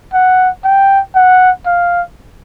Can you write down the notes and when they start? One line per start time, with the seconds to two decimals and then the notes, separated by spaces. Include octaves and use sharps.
0.14 F#5
0.64 G5
1.15 F#5
1.66 F5